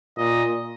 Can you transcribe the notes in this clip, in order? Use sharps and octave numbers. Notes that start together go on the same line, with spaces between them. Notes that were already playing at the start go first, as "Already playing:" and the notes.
A#2 D#5